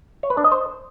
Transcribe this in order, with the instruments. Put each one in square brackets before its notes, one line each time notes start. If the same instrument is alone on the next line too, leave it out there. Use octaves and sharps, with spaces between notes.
[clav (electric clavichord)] C#5
B4
D4
D#5
C5